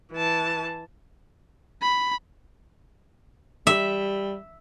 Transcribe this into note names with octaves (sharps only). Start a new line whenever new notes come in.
E3 A5
B5
G3 E5